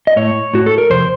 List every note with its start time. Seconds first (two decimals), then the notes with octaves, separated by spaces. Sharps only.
0.07 D#5
0.16 A2 C#5
0.54 A2 F#4
0.66 A4
0.78 A#4
0.90 F2 C3 C5